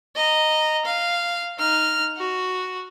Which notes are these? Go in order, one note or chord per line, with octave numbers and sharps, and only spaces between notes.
D#5 A#5
F5
D#4 F6
F#4